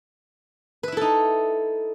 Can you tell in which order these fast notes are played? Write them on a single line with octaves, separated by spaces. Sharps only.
B4 E5 E4 A4 D#4